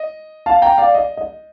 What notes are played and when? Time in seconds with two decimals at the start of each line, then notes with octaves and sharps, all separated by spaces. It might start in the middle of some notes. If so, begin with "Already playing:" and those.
Already playing: D#5
0.46 F5 A5
0.62 G5 A#5
0.78 D5 F5
0.94 D#5
1.17 D#5